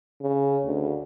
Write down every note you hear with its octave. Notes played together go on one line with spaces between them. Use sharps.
C#3
D2